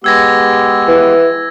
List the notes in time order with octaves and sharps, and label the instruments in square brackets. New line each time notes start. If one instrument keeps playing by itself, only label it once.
[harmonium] G#3 B3 G4 [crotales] E6 G#6 A#6
[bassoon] E3